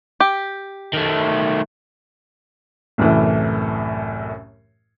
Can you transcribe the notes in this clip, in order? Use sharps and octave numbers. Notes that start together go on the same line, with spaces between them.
G4
D#3 A3
C2 F#2 A2 E3 A3